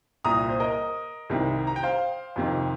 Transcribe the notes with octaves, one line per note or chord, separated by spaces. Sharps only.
C2 A#2 A#5 D#6
C5
A#4 D#5
C2 C3 D#3
A#5
G5
C5 F5
F2 C3 D#3